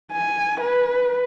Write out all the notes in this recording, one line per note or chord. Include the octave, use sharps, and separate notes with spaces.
G#5
B4